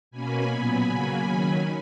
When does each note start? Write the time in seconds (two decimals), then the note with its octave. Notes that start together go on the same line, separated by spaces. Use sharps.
0.11 B2 A#3 C#4 G#5 B5
0.49 A#2 F#3 B3 G#5 B5
0.87 C#3 F#3 A#3
1.25 D#3 F#3 C#4